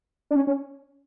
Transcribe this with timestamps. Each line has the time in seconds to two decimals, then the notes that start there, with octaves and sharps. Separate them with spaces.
0.31 D4
0.36 C#4
0.47 C#4